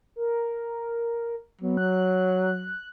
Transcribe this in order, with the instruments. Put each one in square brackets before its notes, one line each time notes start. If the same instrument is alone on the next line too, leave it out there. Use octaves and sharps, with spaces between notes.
[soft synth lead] A#4
[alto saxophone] F#3 [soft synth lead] B3
[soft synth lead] F#6